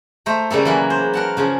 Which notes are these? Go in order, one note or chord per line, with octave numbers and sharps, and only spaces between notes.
A3 C5 A#5
C#3 G3 A#3 A4
E3 F#3 A#3
C5
A#4 F#5 A5
C#3 F3 G#4